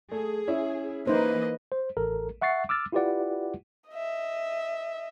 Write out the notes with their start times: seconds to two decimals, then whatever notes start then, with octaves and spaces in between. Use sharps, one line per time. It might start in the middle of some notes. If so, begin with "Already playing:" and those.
0.12 A3 G#4
0.48 C#4 E4
1.07 E3 A#3 D#4 B4 C5 D#5
1.72 C5
1.97 A1 A4 A#4
2.42 E5 F#5 C#6 A6 C7
2.69 D6 E6 F6 A6
2.92 E4 F4 G4 B4 D5 F#5
3.90 D#5 E5